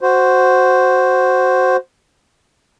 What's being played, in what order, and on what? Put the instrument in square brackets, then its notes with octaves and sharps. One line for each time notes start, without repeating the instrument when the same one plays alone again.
[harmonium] F#4 C5